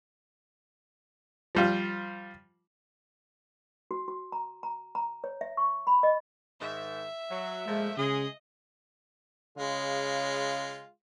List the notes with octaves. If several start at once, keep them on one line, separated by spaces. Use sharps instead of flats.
F3 G3 F4
F#4
F#4
A#5
A#5
A#5
C#5
E5
C#6
B5
D#5
G#2 D#3 E5
F#3
A#2 F3 G#3 A3
C#3 G#3 G#4 D#5
C#3 G#3 F4